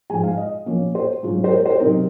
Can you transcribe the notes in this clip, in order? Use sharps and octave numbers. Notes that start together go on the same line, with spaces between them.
G#2 F3 G#3 G#5
F5
D#5
A#2 F3 A#3 C#4
C5
G#2 F#3 C#4 F4
C5
A#4
C5
C3 F#3 C4 D#4 A#4